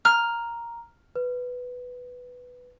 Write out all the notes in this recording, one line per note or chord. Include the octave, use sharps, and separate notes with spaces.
A#5 F6
B4